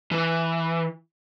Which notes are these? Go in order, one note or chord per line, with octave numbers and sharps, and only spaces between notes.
E3